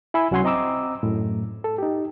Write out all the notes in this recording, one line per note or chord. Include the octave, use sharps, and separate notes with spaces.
E4 G#5 B5 E6
C2 F#3 C#4 F#5 G#5 C6
C4 D#5 A#5 D6 E6
F#2 A2
A4
D#4 G4